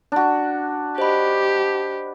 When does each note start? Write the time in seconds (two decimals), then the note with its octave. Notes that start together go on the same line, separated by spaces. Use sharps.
0.12 D4 F#4
0.98 G4 C5 D#5 B5